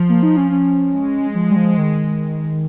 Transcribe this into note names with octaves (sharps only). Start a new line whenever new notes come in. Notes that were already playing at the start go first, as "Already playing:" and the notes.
Already playing: F3
A#3
D#4
C#4
C#4
G#3
F3
G3
F3
D#3